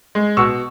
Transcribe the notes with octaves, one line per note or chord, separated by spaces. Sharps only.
G#3
B2 C#6 E6